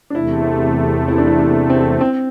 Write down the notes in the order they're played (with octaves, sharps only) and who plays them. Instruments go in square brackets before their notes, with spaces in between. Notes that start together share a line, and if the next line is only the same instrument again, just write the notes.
[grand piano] D4
[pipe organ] E2 C3 A3 [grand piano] E4
[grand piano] E4
D4
E4
D4
C4
C4